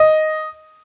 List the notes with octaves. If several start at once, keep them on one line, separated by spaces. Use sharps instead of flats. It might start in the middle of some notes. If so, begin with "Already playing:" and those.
Already playing: D#5